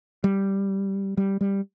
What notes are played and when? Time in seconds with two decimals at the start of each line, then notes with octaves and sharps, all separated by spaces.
0.24 G3
1.17 G3
1.41 G3